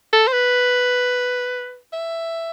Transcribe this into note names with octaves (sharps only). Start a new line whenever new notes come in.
A4
C5
B4
E5